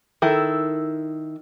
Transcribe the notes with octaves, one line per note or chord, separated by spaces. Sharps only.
D#3 E4 A4